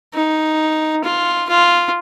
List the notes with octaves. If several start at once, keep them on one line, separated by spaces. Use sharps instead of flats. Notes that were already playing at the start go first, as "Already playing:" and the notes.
D#4
F4
F4